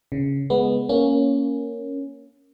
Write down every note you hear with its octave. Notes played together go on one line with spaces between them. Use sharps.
C#3
G#3 B3
A#3 C#4